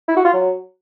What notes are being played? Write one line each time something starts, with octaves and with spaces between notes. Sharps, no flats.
E4
F#4
F4
F#3